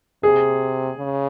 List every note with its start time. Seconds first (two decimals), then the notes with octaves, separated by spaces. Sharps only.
0.23 C3 G#4
0.98 C#3